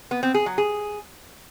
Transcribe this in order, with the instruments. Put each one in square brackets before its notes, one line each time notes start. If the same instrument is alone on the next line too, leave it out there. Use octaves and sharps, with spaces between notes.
[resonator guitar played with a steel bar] B3
C4
G#4
F#3
G#4